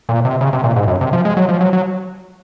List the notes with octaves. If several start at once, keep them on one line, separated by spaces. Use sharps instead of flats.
A#2
C3
C#3
C3
A#2
G#2
F#2
C3
F3
G#3
F#3
F3
F#3
F#3